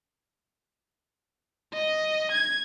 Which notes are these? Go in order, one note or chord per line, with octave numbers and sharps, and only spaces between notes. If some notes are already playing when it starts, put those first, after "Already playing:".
D#5
G#6